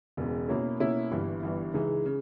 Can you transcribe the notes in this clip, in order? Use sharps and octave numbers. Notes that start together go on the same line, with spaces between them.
E1 E2 C#3
B2 A#3 C#4 E4
B2 A#3 C#4 E4
G1 G2 E3
G1 G2 E3
C#2 C#3 E3 G#3 D#4
C#3